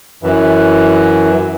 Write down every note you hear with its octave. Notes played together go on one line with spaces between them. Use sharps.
F#2 E3